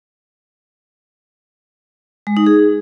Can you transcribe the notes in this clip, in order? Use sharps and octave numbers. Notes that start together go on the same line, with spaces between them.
G#3
D#4
G#4